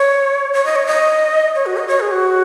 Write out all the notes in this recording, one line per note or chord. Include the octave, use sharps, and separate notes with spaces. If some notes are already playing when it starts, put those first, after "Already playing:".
Already playing: C#5
C#5
D#5
C#5
D#5
C#5
F#4
D#5
C#5
G#4
F#4